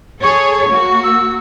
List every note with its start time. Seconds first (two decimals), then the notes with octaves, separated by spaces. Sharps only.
0.23 G#4 A4 C#5 C#6
0.71 A#3 F#4
1.03 E6